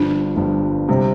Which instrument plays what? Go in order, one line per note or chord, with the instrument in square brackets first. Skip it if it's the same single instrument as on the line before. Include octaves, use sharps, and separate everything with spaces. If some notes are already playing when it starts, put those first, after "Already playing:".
Already playing: [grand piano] G1 G2 F3 [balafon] D4
[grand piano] G1 G2 F3
C3 G3 C4